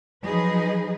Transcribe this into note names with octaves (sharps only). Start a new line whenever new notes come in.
F3 F#3 D#4 G#4 B4 D#5